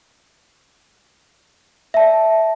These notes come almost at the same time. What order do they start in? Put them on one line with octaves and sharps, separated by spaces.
E5 A5 D5